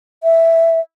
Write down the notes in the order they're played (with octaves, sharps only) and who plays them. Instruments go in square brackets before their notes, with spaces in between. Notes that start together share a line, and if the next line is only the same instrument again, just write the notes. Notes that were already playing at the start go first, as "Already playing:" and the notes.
[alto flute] E5